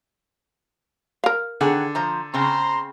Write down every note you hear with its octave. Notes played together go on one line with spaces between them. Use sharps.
A#4 F5
D3 D#3 G#4 F#5
F3 C5 A#5
C#3 C4 C5 A#5 C6